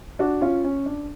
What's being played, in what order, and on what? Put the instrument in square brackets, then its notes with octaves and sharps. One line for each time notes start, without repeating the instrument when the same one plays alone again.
[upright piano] D4 F#4
C#4 F4
C#4
D4